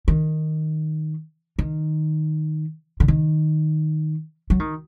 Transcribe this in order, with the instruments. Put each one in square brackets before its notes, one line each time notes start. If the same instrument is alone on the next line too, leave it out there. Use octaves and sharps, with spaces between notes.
[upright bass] D#3
D#3
D3
D#3
F#3
D#3